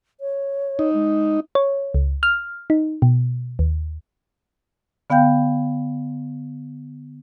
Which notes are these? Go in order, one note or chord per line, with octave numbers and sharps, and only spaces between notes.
C#5
D#4
G#3
C#5
C#2
F6
D#4
B2
D#2
D3 B3 F5 G5 G6